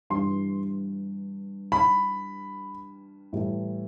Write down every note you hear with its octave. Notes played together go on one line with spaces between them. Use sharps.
G2 E3 G3 C6
B5
A2 E3 G3